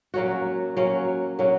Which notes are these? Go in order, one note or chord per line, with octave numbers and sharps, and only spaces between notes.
F#3 A#3 C#4 F#4
F#3 A#3 C#4 F#4
F#3 A#3 C#4 F#4